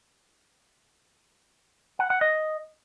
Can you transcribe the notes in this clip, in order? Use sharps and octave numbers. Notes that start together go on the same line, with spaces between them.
F#5
F#5
D#5